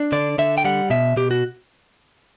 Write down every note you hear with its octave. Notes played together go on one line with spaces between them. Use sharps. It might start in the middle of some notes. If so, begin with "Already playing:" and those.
Already playing: D4
D3 D5
D3 E5
G5
G3 F#5
B2 E5
B2 G4
F#4